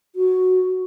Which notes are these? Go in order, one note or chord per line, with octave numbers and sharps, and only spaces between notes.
F#4